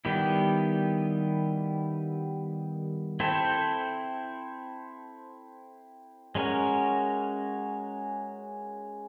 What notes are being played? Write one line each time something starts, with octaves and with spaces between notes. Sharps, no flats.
D#3 G3 B3 E4 G4
C4 E4 A4 C5
G#3 C#4 F#4 A#4